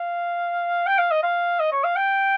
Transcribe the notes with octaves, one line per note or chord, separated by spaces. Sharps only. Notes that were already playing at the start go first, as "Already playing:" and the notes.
Already playing: F5
G5
F5
D#5
F5
D#5
C#5
F5
G5